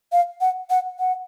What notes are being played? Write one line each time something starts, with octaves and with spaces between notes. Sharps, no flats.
F5
F#5
F#5
F#5